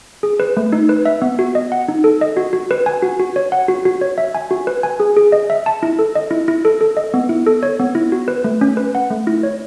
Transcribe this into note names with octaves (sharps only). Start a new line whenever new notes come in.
G#4
B4
A3
D#4
B4
E5
B3
F#4
D#5
F#5
D#4
A4
D#5
F#4
F#4
B4
G#5
F#4
F#4
C#5
F#5
F#4
F#4
C#5
E5
G#5
F#4
B4
G#5
G#4
G#4
D#5
E5
A5
E4
A4
D#5
E4
E4
A4
A4
D#5
B3
E4
A4
C#5
B3
E4
F#4
B4
A3
C#4
B4
F#5
A3
E4
C#5